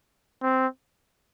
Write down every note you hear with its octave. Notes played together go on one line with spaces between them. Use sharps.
C4